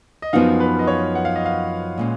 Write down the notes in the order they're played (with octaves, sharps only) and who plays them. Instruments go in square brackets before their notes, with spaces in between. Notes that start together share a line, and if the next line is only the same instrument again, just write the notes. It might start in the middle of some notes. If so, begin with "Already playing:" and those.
[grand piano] D#5
[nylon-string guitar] F#2 F3 B3 D#4 F#4 [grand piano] F5
[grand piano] B4
D#5
C#5
F#5
F5
D#5
F5
[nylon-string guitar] A#2 G#3 C#4